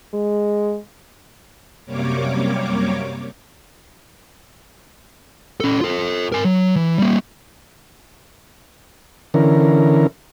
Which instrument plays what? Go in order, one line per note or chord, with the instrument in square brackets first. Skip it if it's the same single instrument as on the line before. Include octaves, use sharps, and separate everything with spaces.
[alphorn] G#3
[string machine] F#2 C3 G3 A#3 C#5 D6
[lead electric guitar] C#4 A4
F4 A4
A#4 G#5
F#3
E3
G3 A#3
[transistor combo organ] D3 E3 C#4 A#4